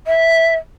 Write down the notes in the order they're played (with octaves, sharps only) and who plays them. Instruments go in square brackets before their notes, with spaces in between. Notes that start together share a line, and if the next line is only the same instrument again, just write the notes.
[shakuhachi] E5